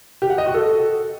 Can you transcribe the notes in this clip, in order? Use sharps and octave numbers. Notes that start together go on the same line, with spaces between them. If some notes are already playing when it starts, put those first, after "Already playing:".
G4
F#5
D#5
F#4
A4